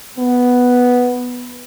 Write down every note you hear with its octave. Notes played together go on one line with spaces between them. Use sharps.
B3